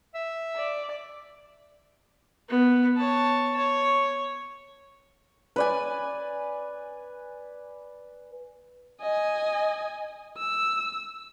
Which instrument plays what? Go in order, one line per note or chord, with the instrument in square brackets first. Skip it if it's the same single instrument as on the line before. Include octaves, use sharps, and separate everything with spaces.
[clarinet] E5
[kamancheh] D5
[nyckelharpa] B3
C#5 A5
C#5
[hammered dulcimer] B4 D5 G#5
[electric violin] D#5 G#5
E6